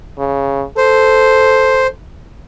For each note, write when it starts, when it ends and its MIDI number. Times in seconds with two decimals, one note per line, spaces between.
0.19 0.64 49
0.77 1.90 69
0.77 1.87 72